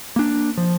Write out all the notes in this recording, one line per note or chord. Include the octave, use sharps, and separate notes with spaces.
A#3 D4
F3